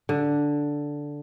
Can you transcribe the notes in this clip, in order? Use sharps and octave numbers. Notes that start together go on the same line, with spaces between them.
D3